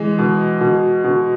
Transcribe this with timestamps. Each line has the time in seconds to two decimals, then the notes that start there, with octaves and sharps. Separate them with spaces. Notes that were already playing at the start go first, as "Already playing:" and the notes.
Already playing: E3 G#3
0.19 B2
0.61 B2
1.04 B2